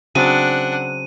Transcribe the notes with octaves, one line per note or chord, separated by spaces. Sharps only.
C#3 F#3 C4 D4 F#5 D#7